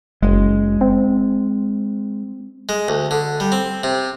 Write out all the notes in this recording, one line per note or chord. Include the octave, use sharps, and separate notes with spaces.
F#1 G#3
C4
G#3
D2
D3
G3
C4
C3